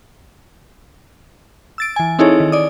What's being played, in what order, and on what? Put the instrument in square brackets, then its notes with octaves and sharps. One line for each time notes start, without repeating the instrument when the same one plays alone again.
[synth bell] E6 A6 D7
E3 G#5
C4 D#4 E4 G#4 A4 C#5
D#3
D5 D#6